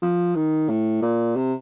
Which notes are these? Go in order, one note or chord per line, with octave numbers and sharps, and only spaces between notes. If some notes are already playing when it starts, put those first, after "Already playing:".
F3
D#3
A2
A#2
C3